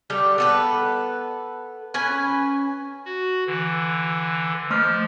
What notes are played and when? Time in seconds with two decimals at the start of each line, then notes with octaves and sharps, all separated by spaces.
0.10 D3 G3 G4 G5
0.38 B3 A4 B4
1.94 C#4 B4 G#5
3.05 F#4
3.47 D3 E3
4.70 F3 A3 C6 F6